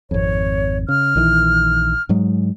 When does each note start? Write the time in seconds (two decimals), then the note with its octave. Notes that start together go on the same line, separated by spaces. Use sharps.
0.11 G#1 F2 C#5
0.89 C#3 F6
1.16 A#1 D#3 E3
2.09 G#2 F#3 G#3